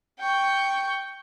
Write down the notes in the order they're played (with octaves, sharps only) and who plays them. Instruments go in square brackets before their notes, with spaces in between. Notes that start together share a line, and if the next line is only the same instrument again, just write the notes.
[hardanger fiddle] G5 C#6